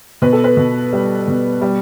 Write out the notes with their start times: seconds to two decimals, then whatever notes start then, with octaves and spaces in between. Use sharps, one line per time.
0.22 B2 B4
0.33 A4
0.44 B4
0.57 B2
0.93 G3
1.28 B2
1.62 G3